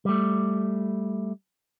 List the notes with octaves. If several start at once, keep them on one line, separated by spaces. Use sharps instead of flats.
G3 A3